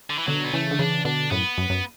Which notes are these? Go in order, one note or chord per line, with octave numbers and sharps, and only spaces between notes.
D3
E3
B2 D3 F#3
B3
C#3 E3 A3
D3
C#3 E3 D4
B2 D3 D4
F#2 A2 B3
F#2
F#2